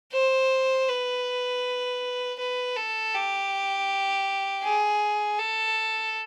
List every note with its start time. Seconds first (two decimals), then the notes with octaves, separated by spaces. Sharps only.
0.13 C5
0.89 B4
2.39 B4
2.77 A4
3.14 G4
4.63 G#4
5.39 A4